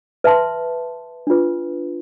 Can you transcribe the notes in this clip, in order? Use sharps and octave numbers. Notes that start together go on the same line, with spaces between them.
B4 E5 A5 C6
D4 F4 B4